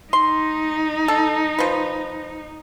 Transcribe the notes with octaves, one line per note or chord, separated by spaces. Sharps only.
D#4 C6
A4
F3 B4